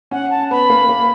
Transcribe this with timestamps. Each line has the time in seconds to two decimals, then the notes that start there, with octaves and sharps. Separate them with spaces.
0.11 C#4 F#5
0.30 A5
0.51 B3 B5
0.70 A#3
0.89 A#3